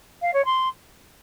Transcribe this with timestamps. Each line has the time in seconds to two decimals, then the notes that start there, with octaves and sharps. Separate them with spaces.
0.21 F5
0.33 C#5
0.45 C6